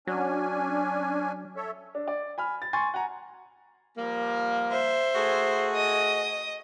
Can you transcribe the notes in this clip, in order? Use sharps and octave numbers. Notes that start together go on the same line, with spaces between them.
F#3 C#4 D4 G#5
A4 C#5 E5
D4
D5
G#5 B5 F6
A6
G#5 C6 C#6 A6
F#5 G#5 A#5
F3 G3 A#3
C5 E5
A3 F#4 G#4
D#5 D#6